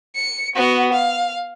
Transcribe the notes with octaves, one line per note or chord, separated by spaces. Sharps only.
C#7
B3 F#4
F5